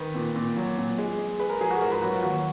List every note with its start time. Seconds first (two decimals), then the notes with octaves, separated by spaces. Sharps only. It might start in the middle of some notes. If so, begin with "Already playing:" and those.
Already playing: D#3 B4
0.15 A#2
0.36 A#2
0.56 F#3
0.78 A#2
0.98 G#3
1.18 G#3
1.39 G#3 B4
1.50 A#4
1.61 F3 G#4
1.71 F#4
1.81 G#2 A#4
1.91 B4
2.02 F#3 F#4
2.12 F4
2.23 D#2 F#4